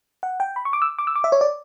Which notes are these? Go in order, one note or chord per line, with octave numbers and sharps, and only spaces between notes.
F#5
G5
B5
C#6
D6
E6
D6
E6
D6
E5
C#5
D5